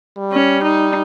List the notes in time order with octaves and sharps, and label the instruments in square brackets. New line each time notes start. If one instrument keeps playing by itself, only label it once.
[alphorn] G3
[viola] C#4
D#4